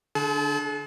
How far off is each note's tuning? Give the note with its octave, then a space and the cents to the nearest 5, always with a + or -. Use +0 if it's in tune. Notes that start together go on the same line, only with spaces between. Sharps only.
D3 +0 G#4 +45 A5 -30